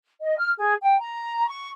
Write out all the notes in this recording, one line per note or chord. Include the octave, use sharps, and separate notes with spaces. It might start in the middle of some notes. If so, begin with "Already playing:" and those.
D#5
F6
G#4
G5
A#5
C#6